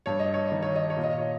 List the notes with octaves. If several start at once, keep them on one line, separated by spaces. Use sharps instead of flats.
G2 C#5
D#5
C#5
D#3 D#5
C#5
D#5
C#5
A#2
D#5
C#5